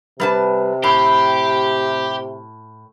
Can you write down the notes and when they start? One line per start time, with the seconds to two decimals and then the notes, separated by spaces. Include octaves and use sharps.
0.20 C3 G3 B4 A5
0.84 A2 G4 B5 C7